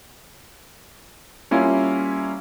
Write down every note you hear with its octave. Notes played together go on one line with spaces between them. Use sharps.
G3 A#3 C#4 E4 F4